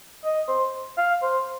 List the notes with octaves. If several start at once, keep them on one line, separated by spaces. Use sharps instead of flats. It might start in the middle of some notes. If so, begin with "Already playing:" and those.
D#5
C5
F5
C5